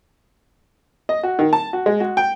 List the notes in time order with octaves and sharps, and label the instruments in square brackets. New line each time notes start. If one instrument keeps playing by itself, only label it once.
[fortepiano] D#5
F#4
D#3
A5
F#4
G#3
F#4
G5